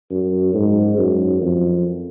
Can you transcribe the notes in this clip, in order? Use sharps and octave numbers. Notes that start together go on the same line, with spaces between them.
F#2
G#2
F#2
F2